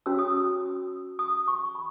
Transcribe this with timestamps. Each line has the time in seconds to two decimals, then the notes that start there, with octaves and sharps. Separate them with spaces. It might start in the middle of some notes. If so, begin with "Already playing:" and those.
0.06 C#4 F#4 C#5 E6
0.19 D#6
0.30 E6
1.19 D#6
1.48 C#6
1.75 B5